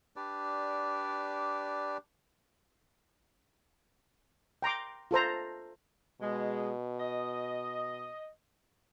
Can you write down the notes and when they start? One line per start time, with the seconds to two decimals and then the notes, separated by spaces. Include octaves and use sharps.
0.16 D4 G4 B4 D5
4.62 G5 A#5 C6 D6
5.11 F4 A4 C5 A#5
6.21 B2 G#3
6.99 D#5